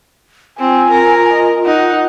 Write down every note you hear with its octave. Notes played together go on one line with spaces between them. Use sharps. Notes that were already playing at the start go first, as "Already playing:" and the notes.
C4 F4 G#5
A#4
D#5
D#4 F#5